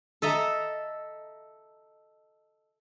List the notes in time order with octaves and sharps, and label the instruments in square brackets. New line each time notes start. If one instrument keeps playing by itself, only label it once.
[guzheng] A4 D#5 E5 A#5